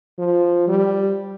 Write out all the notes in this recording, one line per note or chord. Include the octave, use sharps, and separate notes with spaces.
F3
G3